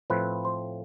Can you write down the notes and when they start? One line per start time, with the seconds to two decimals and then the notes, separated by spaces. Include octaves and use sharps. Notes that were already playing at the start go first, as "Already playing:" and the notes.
0.10 A2 F3 C4 B4
0.45 C5